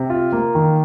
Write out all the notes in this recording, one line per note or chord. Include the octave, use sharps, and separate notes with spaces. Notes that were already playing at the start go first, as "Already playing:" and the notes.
Already playing: C3
F4
A#3
D#3